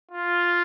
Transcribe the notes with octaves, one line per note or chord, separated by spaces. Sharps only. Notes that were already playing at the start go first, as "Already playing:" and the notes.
F4